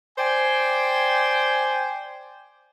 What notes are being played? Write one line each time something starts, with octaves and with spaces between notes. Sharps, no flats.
C5 D5 G5 G#5